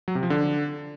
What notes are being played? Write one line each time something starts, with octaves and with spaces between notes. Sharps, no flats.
F#3
C3
F3
D3